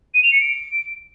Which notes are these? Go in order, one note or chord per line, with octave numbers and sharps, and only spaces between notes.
D#7
F7
C#7
D7